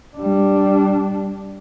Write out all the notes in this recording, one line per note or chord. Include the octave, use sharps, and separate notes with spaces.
G3 D4